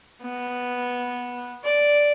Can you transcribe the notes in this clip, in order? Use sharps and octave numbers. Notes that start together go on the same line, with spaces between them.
B3
D5